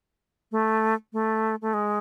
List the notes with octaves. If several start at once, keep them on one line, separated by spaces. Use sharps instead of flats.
A3
A3
A3
G#3